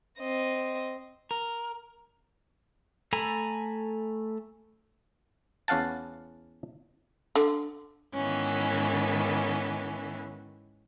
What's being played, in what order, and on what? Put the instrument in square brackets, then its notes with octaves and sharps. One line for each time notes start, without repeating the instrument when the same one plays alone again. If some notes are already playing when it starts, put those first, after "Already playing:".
[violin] C4 D#5
[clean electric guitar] A#4
[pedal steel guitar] A3 A4 G#5 A#5 B5
[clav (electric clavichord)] E2 C#4 F5 F#5 A5
[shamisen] D3
[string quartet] G#2 D#3 E3 B3 C#4